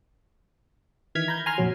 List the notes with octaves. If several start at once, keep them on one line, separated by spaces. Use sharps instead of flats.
D#3 E3 F6 G#6 B6
A#5 B5 G6 G#6
G#5 A#5 C6 F6
A#1 F2 F#3